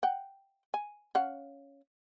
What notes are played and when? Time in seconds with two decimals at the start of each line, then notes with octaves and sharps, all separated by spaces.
0.03 F#5 G5
0.74 G#5
1.15 C#4 F5 F#5